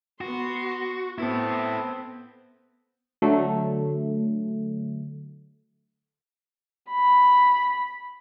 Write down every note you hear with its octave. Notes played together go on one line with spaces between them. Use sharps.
B3 F#4 C6
B3 C4 E4 A4
D3 F#3 A3
B5